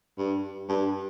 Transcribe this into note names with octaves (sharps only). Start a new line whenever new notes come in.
G2
G2